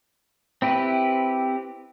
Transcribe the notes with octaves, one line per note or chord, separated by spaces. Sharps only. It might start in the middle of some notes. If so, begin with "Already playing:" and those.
C4 E4 G4 B4